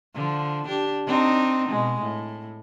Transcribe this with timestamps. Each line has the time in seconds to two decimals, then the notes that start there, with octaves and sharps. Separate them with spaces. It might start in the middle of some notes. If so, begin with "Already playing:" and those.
0.14 D3 F3
0.66 D4 G4
1.07 C4 D4 D#4
1.69 B2 G#3
2.02 A2